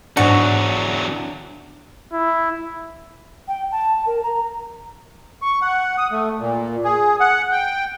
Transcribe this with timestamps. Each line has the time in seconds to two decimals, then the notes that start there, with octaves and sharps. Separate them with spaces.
0.17 E2 G#2 F#3 D4 F#4 C#7
2.12 E4
3.48 G5
3.71 A5
4.06 A#4
4.23 A#5
5.42 C#6
5.62 F#5
5.98 D#6
6.12 A3
6.39 A#2
6.84 G#4
7.20 F#5
7.51 G5